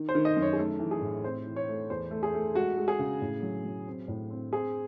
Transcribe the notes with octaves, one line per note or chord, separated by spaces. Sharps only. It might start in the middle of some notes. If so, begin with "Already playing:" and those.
Already playing: D#3
C5
D#3
D#5
F#2
C#5
G#4
A3 A4
E3
G#4
A2
C4 C5
E3
C#5
A3
E2 C5
A3
G#4
A3
G#3 F#4
G#3
G#4
C#3
A2
F#3
F#3
C4
A2
C4
C4 G#4